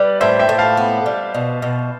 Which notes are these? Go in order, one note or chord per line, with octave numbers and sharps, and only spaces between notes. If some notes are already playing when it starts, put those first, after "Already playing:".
Already playing: G3 B4 D5
A2 C5 E5
E5 G5
A2
F5 A5
B3
G3
B2
B2